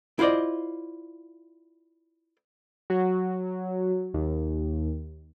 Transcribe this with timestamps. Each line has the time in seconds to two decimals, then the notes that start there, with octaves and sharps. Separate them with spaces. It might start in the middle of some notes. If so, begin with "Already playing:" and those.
0.19 E4 F4 C5 D5 D#5
2.90 F#3
4.14 D#2